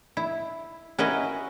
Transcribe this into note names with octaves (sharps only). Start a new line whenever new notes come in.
E4
C#4 E4 F#4 A#4 B4 D#5